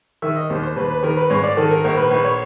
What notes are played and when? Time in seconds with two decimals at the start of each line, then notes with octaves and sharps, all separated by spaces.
0.22 D#3 E5
0.36 D#5
0.50 D#2 C5
0.63 C5
0.76 D#2 B4
0.90 B4
1.03 D#3 A#4
1.17 B4
1.30 G#2 C#5
1.44 D5
1.57 D#3 A4
1.71 A#4
1.84 A#1 A#4
1.97 B4
2.10 A#1 B4
2.24 C#5